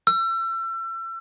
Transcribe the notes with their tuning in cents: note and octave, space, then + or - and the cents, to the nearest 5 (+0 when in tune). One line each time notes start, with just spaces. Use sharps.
E6 +35